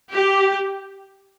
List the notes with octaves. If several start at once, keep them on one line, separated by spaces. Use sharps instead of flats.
G4